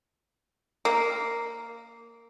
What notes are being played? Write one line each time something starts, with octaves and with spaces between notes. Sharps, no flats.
A#3